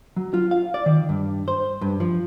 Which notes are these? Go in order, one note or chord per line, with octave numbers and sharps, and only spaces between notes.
F#3
F4
F5
D5
D#3
G2
C5
G2
F3